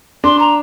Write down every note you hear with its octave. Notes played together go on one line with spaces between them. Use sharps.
D4 C6
A#5